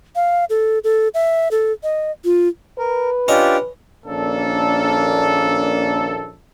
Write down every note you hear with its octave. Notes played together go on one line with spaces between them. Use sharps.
F5
A4
A4
E5
A4
D#5
F4
A#4 B4
C#4 D4 F4 G4 D#5
A#1 D#3 A#3 C#4 D4 A4